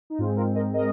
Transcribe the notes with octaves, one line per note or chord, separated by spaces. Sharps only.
D#4
G#2 G#3 C4 F4
F4 A#4
A#4 D#5
A#4 D#5